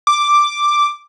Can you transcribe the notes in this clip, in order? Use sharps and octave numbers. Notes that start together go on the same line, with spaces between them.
D6